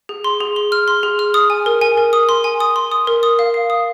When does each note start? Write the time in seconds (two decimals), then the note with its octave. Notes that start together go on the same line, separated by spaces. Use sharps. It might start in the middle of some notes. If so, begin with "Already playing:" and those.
0.09 G#4
0.24 C6
0.41 G#4
0.56 C6
0.72 F6
0.88 C6
1.03 G#4
1.19 F6
1.34 D#6
1.50 G#5
1.66 A#4
1.81 G#5
1.97 A#4
2.13 D#6
2.29 C6
2.44 G#5
2.60 D#6
2.76 C6
2.91 D#6
3.07 A#4
3.23 D#6
3.39 F5
3.54 F5
3.70 D#6